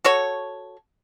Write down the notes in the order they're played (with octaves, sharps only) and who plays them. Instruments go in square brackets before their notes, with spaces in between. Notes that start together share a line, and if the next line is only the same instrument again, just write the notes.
[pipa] F#4 A4 C#5